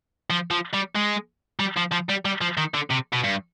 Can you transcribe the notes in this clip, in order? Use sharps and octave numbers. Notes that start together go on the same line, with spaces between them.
F3
F3
G3
G#3
G3
F3
F3
G3
G3
F3
D#3
D3
C3
B2
G2